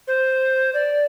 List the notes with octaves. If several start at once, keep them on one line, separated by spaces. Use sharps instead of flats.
C5
D5